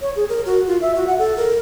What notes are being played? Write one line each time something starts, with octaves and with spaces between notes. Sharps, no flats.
C#5
G#4
A#4
F#4
F4
E5
F#4
F#5
A4
A#4